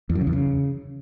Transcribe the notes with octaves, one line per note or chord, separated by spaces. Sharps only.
E2
F#2
C#3
E2
C#3